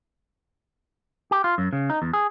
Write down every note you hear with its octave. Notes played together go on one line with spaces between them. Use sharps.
G4
F4
F#2
C#3
D#4
E2
G#4